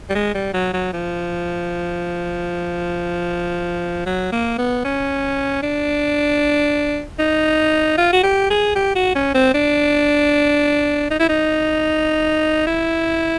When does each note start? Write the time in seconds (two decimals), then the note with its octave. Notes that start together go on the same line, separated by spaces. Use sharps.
0.10 G3
0.15 G#3
0.34 G3
0.54 F#3
0.74 F#3
0.93 F3
4.06 F#3
4.32 A#3
4.58 B3
4.85 C#4
5.63 D4
7.19 D#4
7.97 F4
8.13 F#4
8.24 G4
8.50 G#4
8.75 G4
8.95 F#4
9.15 C#4
9.34 C4
9.54 D4
11.11 D#4
11.19 E4
11.29 D#4
12.67 E4